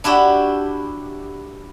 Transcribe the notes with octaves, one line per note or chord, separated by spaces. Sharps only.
D4 E4 F#4 G4